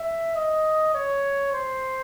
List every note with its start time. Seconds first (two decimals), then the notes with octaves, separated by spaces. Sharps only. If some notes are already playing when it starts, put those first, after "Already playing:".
Already playing: E5
0.36 D#5
0.94 C#5
1.53 C5